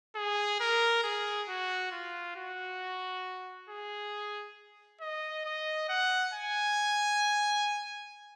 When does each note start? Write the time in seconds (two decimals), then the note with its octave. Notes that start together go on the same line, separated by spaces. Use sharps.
0.15 G#4
0.60 A#4
1.03 G#4
1.49 F#4
1.92 F4
2.36 F#4
3.69 G#4
5.01 D#5
5.45 D#5
5.89 F#5
6.34 G#5